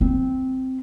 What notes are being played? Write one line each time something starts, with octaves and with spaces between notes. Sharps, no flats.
C4